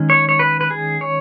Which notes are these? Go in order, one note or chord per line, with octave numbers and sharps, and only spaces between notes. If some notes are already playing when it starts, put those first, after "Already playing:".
Already playing: D#3 G#3 C#4
C#5
C#5
B4
B4
G#4
C#5